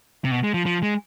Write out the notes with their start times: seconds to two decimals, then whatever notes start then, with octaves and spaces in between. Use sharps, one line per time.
0.24 C3
0.31 B2
0.43 G#3
0.54 F3
0.66 F3
0.83 G#3